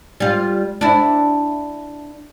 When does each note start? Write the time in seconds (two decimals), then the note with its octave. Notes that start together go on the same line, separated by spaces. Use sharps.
0.20 G3 F4
0.81 D4 E4